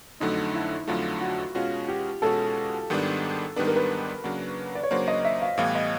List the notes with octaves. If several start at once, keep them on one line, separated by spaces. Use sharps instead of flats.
F2 D3 F#3 A3 D#4
E4
F2 D3 F#3 A3 F4
F#4
B2 G#3 C#4 F4 F#4
G4
B2 G#3 C#4 F#4 A4
G#2 D#3 G3 B3 D4
G#2 D#3 G3 B3 D4 B4
A#4
B4
C#3 F#3 A#3 D4 F#4
D5
C#5
C#3 F#3 A#3 D4 F#4 C5
D#5
E5
F5
A2 E3 G3 B3 F5
D#5